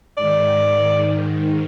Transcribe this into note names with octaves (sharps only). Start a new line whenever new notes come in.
G#2 D#3 D5